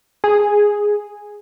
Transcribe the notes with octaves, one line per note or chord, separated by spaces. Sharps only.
G#4